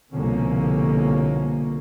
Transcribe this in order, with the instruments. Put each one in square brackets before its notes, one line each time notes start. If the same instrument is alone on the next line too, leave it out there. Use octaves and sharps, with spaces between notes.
[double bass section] C2 B2 D3 F3 A#3 C#4